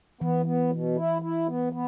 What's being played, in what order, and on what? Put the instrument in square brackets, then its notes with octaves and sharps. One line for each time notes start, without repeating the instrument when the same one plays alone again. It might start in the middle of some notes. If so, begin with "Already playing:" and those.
[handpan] E3 [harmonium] B3
[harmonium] B3
B2
E4
E4
B3
B3